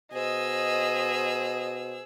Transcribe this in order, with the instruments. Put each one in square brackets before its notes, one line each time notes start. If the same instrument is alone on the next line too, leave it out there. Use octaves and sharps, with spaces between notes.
[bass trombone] B2 [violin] G#4 E6 [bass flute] C5 [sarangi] D#5